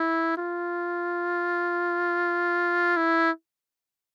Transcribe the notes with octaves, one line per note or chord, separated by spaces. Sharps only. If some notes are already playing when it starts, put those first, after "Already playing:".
Already playing: E4
F4
E4